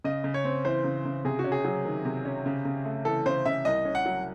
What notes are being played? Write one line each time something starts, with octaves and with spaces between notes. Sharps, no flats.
C#3 D#5
C#3
C#5
C4
E3 C5
C#3
C#3
C3 G#4
F#4
C#4
G#4
F#3
D#3
C3
C#4
C#3
C#3
A3
E3 A4
C#3 C5
C#3 E5
C2 D#5
C#4
F#5
F#3